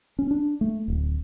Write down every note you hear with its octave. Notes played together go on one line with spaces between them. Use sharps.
C#4
D4
A3
D1